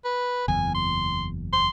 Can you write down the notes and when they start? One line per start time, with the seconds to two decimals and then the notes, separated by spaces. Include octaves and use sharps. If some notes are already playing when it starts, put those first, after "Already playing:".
0.05 B4
0.48 F#1 E2 G#5
0.75 C6
1.53 C6